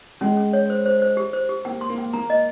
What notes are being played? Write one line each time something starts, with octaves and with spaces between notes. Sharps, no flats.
G#3 C#4
C#4
C#5
C5
C5
C5
G4
C5
G4
A#3 G5
C6
A#3
G5
A#3 A#5
D#5